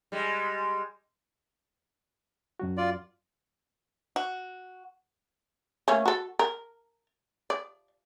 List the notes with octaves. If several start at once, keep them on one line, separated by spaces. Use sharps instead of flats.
G3 G#3
F#2 F#3 F#4
F4 D5
F#4
A3 A#3 C#4
F#4 A4
A#4
D5